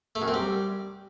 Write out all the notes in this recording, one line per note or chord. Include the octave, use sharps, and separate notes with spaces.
A3
F#2
C4
G3